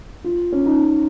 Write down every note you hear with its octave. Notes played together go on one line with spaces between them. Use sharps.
F4
C#4
D#4